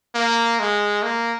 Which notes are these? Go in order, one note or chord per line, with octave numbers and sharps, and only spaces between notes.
A#3
G#3
A#3